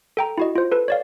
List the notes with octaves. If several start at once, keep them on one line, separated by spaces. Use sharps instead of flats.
A4 G5 A#5
E4 F#4 D#5
F4 C5
A4 B4
C#5 D5 F5